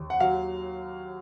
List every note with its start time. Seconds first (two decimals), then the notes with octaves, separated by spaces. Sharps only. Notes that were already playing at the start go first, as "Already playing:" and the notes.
Already playing: D#2
0.10 F#5
0.20 F#3 F5